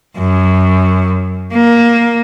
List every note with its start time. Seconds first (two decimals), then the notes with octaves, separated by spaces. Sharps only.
0.18 F#2
1.53 A#3